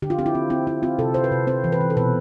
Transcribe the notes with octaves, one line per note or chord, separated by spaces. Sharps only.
D3 G4
F4
C4 G4
E4
C4
C4 E4
C4 E4
C4 F4
C3 A4
C3 C5
B4
C3
C4 C5
E3
B4
E3
A4
B2 B4